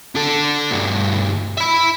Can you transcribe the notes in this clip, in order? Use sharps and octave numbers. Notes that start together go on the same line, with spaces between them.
D4 A4
D2 G2
E5 B5